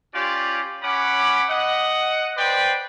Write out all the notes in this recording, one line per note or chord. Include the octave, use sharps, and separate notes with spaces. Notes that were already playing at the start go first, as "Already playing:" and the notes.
C#4 F4 G4 D5
C#4 F#5 B5 D6
D#5 F#5
B4 C5 D5 G5